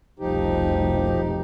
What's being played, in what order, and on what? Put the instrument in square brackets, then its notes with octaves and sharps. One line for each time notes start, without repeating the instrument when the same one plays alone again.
[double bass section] F1 C2 B2 [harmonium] F3 D#4 G4